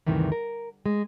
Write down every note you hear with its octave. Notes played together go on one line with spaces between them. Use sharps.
D2 G2 C3 D#3 E3
A#4
G#3